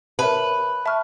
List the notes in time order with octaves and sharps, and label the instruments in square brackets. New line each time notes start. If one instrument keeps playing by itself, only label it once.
[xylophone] A#4 C#5 E5 A5 [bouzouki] B4
[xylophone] E5 A5 C#6 F6